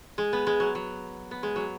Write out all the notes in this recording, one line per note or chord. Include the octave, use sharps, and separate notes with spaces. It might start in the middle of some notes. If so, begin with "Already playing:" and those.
G#3
B3
G#3
F#3
F#3
B3
G#3
F#3